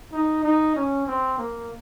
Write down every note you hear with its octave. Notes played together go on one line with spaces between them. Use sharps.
D#4
D#4
C#4
C4
A#3